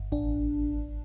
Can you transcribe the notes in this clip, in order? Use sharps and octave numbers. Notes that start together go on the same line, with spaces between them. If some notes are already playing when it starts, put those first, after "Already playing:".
Already playing: G1
A1 D4